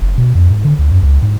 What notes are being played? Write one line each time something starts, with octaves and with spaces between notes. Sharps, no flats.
F#1
B2
F2
G#2
D3
D2
F#2
C#2
G#2